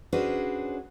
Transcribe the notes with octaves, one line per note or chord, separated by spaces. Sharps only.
C#4 D4 F#4 G#4 B4 C5